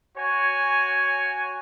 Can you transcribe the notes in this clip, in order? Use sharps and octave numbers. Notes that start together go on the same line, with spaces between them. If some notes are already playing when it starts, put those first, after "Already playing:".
F#4 C#5 G#5